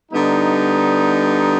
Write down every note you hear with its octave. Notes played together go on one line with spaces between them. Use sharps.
D3 G3 B3 D#4